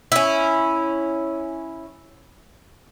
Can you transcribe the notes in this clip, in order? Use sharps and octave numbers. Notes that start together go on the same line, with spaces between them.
C#4 E4